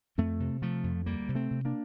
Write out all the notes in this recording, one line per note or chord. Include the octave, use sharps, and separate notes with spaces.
F2 A3 C4
C3
C3 F3 A3
F2
D2 G3 A#3
C3
A3 C4
C3
A#3 D4